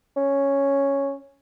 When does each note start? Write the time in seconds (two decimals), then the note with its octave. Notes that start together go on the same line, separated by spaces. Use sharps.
0.17 C#4